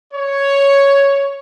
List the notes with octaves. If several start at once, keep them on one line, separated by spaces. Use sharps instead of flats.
C#5